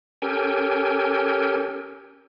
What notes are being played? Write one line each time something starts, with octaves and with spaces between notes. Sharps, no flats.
C#4 G4 A4 A#4 G5 G#5